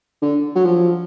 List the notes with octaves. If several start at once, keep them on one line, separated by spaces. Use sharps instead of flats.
D3
F#3
F3